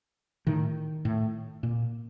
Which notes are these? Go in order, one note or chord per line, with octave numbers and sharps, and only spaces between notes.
A2 D#3
A2
A#2